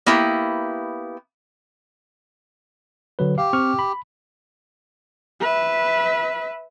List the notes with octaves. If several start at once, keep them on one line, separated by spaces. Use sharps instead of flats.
A#3 B3 E4 G4
D3 F#3 B4
G4 F5
C4 C#6 F6
B5
B4 E5